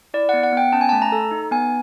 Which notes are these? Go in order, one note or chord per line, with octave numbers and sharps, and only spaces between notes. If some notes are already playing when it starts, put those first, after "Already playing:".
E4 D5
B3 F#5
F#5
B3 G5
C#4 A5
G#5
A3 A5
A#5
A4
D#4
B3 G#5